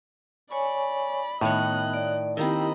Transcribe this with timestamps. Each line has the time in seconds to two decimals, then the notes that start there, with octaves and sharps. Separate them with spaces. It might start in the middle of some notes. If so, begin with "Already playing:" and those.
0.51 C#5 D5 G#5 B5 C#6
1.41 A2 D#3 B3 C#5 D#5 F#6
1.94 D5
2.37 D#3 A#3 C4 E4 G4 D#5 B5